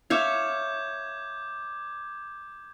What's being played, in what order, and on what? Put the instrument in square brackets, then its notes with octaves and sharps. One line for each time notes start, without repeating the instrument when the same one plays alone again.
[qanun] C#5 E5 F5 [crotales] D6 G6 G#6